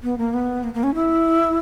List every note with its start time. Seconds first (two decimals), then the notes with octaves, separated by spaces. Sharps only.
0.03 B3
0.18 A#3
0.34 B3
0.64 A#3
0.74 A#3
0.83 C#4
0.95 E4